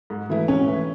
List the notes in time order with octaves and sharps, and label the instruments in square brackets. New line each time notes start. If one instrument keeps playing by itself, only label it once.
[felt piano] G#2
E3 A3 E4 B4
[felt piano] G#2 [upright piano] C#4
[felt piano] E3 A3 E4 B4